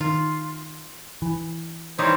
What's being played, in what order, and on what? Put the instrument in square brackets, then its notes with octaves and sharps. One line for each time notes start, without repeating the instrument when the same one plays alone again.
[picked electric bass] D#3 [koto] F4
[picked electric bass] E3
[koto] E3 G3 D#4 [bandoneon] C5 C#5